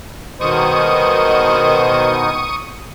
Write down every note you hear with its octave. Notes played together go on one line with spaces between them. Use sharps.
B2 D#3 C5 D#5 C#6 D#6